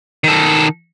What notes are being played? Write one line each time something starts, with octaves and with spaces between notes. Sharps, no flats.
D#3 A4